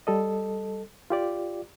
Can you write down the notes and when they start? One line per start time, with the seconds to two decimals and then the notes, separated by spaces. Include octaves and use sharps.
0.07 G3 A4 D#5
1.10 F4 G4 D5